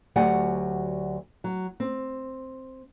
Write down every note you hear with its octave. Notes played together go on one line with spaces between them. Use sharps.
D2 F#3 G4 D5 F#5 G#5
F#3
C4